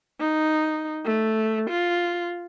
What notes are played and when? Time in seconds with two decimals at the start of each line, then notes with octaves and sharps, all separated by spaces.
0.20 D#4
1.05 A3
1.70 F4